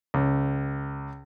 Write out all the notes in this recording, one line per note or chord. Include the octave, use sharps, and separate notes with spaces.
C#2